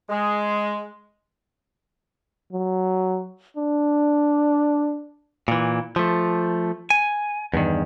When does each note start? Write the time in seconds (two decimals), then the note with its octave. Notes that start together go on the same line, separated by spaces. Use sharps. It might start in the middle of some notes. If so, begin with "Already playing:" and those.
0.10 G#3
2.53 F#3
3.57 D4
5.48 A#2 E3
5.96 F3 A3
6.90 G#5
7.53 E2 G2 D#3